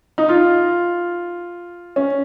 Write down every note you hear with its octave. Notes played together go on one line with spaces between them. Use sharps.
D#4
F4
C#4